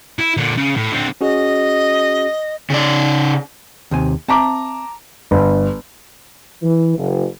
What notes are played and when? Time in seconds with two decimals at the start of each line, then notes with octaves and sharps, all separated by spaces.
0.19 E4
0.37 A#2 D3
0.58 C#3
0.77 A2
0.93 D3 C4
1.21 C#4 F#4 G#4 D#5
2.70 C#3 D5
3.91 D#2 C3 G#5
4.28 C4 E5 A5 A#5 D6
5.31 G1
6.63 E3
6.97 F#1